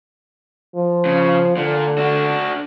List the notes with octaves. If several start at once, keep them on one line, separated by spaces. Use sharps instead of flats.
F3
C#3
A#2 D3
D4 F#4